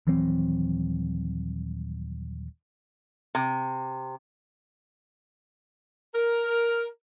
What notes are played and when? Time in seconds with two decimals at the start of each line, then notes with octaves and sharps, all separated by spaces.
0.07 D#1 E3 F#3 C4
3.35 C3
6.15 A#4